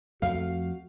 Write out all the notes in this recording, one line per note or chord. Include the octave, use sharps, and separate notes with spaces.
F2 A3 F#4 F5